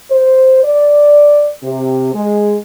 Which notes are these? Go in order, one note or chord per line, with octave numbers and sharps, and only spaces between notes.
C5
D5
C3
G#3